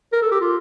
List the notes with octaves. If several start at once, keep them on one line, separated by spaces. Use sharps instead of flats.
A#4
A4
G4
F4